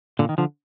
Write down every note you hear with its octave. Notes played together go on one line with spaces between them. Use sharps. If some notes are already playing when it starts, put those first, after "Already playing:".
A#2 D3
D#3
D3 F3